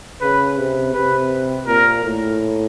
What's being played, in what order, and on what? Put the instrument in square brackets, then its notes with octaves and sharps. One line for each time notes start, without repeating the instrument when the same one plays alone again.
[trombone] C#3 [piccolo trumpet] B4
[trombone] C3
[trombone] C3 [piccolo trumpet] B4
[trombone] A#2 [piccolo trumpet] A#4
[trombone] A2